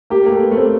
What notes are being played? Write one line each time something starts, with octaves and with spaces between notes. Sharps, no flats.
A#3 G4
A#3
A3
B3
A3
C4